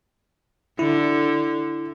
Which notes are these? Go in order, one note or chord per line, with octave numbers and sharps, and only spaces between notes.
D3 E4